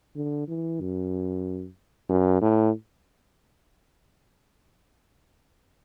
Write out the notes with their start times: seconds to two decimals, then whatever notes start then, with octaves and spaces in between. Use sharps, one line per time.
0.16 D3
0.48 E3
0.80 F#2
2.09 F#2
2.41 A2